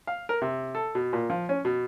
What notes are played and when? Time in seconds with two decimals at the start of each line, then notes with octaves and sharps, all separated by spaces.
0.07 F5
0.29 A#4
0.42 C3
0.75 A4
0.95 B2
1.13 A#2
1.30 F3
1.49 C#4
1.65 B2